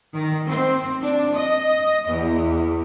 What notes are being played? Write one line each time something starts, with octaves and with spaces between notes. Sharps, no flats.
D#3
C4
D4
D#5
E2